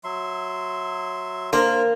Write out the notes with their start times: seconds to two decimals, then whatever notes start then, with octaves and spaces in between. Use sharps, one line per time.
0.04 F#3 E5 C6
1.53 A#3 D4 A#4 C5